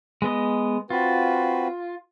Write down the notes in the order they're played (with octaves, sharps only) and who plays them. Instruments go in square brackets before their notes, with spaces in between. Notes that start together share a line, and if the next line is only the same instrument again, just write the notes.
[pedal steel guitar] G#3 B3 D#5
[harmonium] C4 F#4 B4 [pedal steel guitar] F4